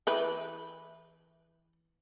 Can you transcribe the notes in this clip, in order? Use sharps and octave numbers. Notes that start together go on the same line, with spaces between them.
E3 B4 G5